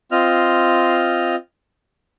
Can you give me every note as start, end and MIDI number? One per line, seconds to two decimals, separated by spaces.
0.12 1.35 60
0.12 1.35 65
0.12 1.35 75
0.12 1.35 89